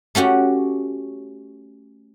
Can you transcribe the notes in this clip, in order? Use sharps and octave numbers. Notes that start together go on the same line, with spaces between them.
A3 C#4 F#4 G4